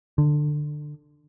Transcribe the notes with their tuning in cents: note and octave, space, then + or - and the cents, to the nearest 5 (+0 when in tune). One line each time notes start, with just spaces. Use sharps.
D3 +20